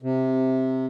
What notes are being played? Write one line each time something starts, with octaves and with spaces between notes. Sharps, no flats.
C3